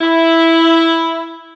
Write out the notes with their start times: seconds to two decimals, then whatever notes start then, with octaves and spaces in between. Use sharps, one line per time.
0.01 E4